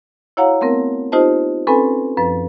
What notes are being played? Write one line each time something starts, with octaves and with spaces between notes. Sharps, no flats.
E4 F#4 C#5 F5 F#5 A#5
A3 B3 C4 A#4
D#4 F4 G4 C5 D#5 A5
C4 C#4 A4 B4 G#5 B5
F#2 F3 B4